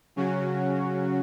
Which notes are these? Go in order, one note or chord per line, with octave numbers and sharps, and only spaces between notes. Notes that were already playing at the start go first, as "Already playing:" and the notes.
C#3 F#3 C#4 F#4